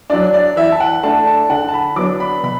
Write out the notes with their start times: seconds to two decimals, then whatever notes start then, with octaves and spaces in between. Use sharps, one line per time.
0.10 F#3 D4 D5
0.34 D5
0.56 E3 E5
0.72 A5
0.80 F#5
1.03 A3 D4 A5
1.27 A5
1.49 D3 F#5
1.68 A5
1.73 B5
1.96 F#3 B3 D4 D6
2.20 B5
2.44 B2 B5